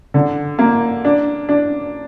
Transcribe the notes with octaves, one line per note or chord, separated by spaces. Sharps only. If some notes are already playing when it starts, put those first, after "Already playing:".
D3
A#3
D4
D4